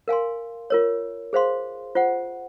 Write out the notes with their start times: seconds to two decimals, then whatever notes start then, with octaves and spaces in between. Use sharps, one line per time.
0.08 A#4 F5 G#5 C6
0.70 F4 A#4 C#5
1.33 G#4 C5 F5 C6
1.95 F4 C5 F#5